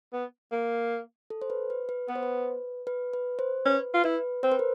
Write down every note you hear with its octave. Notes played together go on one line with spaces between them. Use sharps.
B3
A#3
A4
C5
B4
B4
B4
B3 B4
C5
B4
B4
B4
C5
C#4 B4
F4
E4 B4
C4 C5
B4
A#4